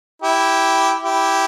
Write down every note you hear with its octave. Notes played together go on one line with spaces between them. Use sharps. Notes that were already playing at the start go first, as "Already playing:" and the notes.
E4 G4
E4 G4